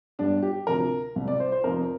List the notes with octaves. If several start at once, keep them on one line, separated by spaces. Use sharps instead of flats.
G1 G2 G3 D4
G4
D2 C3 F3 A#4
C2 C3 G3
D5
C5
C5
F1 F2 C3 F3 A#4